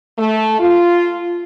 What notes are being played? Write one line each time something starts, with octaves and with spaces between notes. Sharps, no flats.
A3
F4